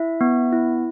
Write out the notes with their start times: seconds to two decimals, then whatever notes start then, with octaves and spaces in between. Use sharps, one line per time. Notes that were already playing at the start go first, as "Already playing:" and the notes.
Already playing: E4 E5
0.21 B3
0.53 E4